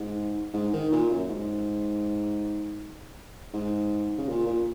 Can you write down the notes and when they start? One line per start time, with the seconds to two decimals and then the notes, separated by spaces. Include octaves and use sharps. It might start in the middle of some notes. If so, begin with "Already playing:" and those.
Already playing: G#2
0.54 G#2
0.73 D#3
0.92 A#2
1.10 F#2
1.28 G#2
3.54 G#2
4.18 C#3
4.28 A#2
4.46 A#2